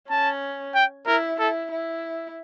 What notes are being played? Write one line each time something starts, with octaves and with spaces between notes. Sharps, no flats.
C#4 A5
G5
E4 A#4
E4 A4
E4